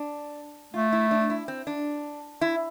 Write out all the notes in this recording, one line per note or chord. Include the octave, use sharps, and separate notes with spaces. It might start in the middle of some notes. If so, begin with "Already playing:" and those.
Already playing: D4
A3 F4
E4
D4
E4
C4
D4
E4